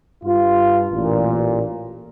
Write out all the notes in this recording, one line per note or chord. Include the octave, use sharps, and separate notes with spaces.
G2 F4
A1 A#2